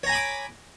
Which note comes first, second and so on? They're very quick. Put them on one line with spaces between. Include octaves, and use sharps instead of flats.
C#5 A#5 G#5 B5 D6